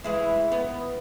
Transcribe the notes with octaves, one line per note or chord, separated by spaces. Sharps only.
E3 G#3 E4
B3